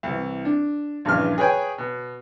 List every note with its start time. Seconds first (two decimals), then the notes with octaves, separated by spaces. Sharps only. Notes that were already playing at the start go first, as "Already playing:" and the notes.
0.03 C2 E3
0.45 D4
1.05 A#1 G2 C#3 E3 F6
1.38 G#4 B4 C#5 G5 G#5
1.78 B2